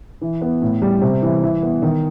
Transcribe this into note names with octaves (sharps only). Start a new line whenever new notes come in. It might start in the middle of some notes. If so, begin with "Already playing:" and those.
E3
B3
A2
G3
C3
E3
E3
B3
D#3